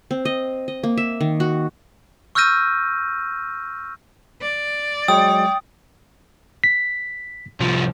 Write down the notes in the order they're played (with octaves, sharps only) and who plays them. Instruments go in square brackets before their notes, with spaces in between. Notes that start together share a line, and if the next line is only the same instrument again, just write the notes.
[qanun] C4
D#5
D#5
A#3
E5
D#3
F#4
[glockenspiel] C#6 E6 F6 G6 A#6 D#7
[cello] D5
[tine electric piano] F#3 G#3 [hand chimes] G5 [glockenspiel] D#6
[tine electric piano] B6
[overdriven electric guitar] C2 F3